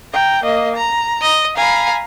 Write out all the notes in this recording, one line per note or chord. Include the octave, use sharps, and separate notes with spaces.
G5 A#5
A#3 D#5
A#5
D#5
F5 G#5 A#5 B5